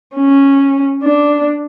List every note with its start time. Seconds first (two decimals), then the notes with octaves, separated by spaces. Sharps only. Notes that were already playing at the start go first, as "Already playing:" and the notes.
0.16 C#4
1.03 D4